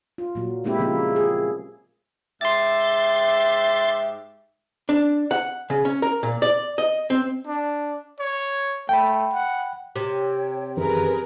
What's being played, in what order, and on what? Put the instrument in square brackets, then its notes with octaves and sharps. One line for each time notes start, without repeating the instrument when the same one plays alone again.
[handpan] F4
A#2 F#3
G#3 A#3 C4 E4 G4
C#3 F3 A#3 E4
G#4
[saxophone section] G#2 G4 E5 [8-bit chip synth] C6 A6
[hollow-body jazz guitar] D4
F#5
C#3
C#4
A#4
A#2
D5
D#5
C4
[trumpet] D4
C#5
[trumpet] A3 [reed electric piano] G5 B5
[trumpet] F#5
[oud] C3 [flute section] C#5 G5
[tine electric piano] F#2 D#3 E3 [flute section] G#4 [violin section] A#4 B4